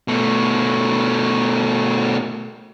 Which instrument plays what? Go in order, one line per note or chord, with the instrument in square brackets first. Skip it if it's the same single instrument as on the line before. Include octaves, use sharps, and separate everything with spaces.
[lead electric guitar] B2 A3